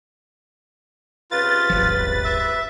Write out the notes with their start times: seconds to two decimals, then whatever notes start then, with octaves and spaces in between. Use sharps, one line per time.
1.31 C#2 C3 F4 B4 A6
1.70 D1 G1 F3
2.24 E5